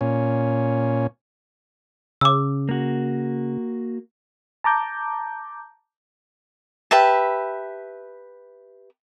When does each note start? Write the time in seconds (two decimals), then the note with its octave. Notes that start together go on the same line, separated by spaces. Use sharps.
0.01 A#2 C#4
2.21 C#3 D6 E6
2.69 A#3 F#4
4.64 A5 A#5 D6 G6
6.91 G4 B4 E5 A5